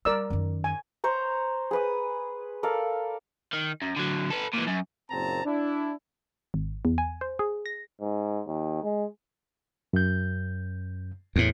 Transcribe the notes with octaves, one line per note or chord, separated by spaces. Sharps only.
G3 A#4 D5 E6
F#2 D#3
G#5
C5 C#5 A#5
G#4 B4 D#6
A4 A#4 D5 F5
D#3
F#2
D3 F#3
A4 B4
A#2 E3
F#2
F#1 A#2 C4 C5 A5 A#5
D4 E4
G#1
E2
G#5
C5
G#4
A#6
G#2
D#2
G#3
F#2 G6
E2 A2